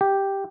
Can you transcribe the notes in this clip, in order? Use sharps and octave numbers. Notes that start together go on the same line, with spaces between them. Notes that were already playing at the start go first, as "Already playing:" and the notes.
G4